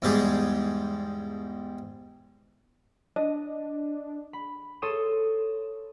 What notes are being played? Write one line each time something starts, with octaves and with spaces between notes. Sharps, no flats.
E2 G#2 G3 G4 G#4
D4 D#5
B5
A4 C#5 C6 D#6 D#7 E7